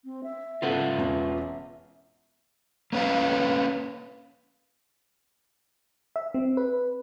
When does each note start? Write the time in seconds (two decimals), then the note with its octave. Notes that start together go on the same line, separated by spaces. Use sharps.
0.04 C4
0.23 E5
0.62 C#3 B3 F4 A4 B4 F#5
0.98 E1 C#4
2.93 A#3 C#4 B4 F5
6.16 E5
6.34 C4
6.57 B4